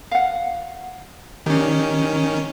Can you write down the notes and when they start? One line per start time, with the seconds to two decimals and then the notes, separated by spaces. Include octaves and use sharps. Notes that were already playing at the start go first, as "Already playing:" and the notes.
0.11 F5 F#5
1.46 D#3 C#4 D4 G4